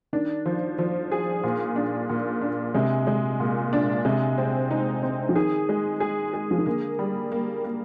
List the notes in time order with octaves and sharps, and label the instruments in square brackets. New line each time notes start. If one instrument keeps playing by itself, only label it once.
[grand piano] D#3 [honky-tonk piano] D4
[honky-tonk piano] F3
F3
G#4
A#2
D4
A#2
D4
[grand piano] C3 [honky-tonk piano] G#3
[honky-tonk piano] G#3
A#2
D4
[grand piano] C3 [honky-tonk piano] G#3
[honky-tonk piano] C4
D#4
C4
[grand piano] F3
[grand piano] D#3 [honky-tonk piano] G#4
[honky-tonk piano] G#3
G#4
G#4
[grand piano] F3
D#3
[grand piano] D3 [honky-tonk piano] A#3
[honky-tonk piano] G3
A#3
A#3